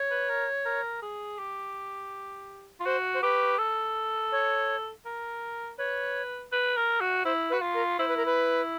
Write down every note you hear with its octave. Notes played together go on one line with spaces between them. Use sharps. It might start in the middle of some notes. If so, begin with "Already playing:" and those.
Already playing: C#5
B4
A#4
A#4
G#4
G4
F4
F#4 C5
C5
G4 B4
A4
C#5
A#4
B4 C#5
B4
A#4
F#4
E4 C5
B4
F#4
F4
A#4
E4 C5
B4
A#4
B4